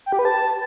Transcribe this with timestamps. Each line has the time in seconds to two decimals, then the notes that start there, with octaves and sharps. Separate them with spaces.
0.06 G5
0.12 G4
0.19 B4
0.25 A5